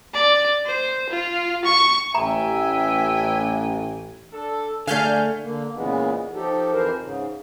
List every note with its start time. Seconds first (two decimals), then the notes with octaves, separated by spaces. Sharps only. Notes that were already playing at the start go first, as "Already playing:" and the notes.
0.14 D5
0.66 C5
1.10 F4
1.65 C#6
2.15 A1 E5 G5 G#5 A#5
4.32 D4 A4
4.87 D3 A3 G#4 D5 F5 G#5 F6 G6
5.42 D3 A#3
5.75 A#2 C#3 E3 G#3 B3
6.34 F3 D#4 G4 A4
6.72 F2 E3 A#4 C5
7.01 G#2 C#3